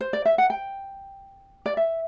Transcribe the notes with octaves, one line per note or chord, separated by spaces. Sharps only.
C5
D5
E5
F#5
G5
D5
E5